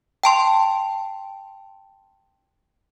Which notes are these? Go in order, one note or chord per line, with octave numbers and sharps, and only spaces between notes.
G5 A5 C6